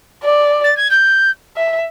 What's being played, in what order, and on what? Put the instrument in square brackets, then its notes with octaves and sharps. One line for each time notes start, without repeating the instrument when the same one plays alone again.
[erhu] D5
[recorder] A6
G#6
G6
[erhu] E5